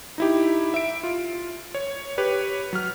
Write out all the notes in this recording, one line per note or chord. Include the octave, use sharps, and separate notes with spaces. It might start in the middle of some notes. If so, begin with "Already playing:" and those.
D#4 E4 G4
E5 D7
F4
C#5
G4 B4 C#5
F#3 F6